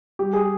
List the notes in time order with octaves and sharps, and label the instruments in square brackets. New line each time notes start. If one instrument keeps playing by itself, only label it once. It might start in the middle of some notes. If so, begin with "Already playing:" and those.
[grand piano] G3 G4
G#4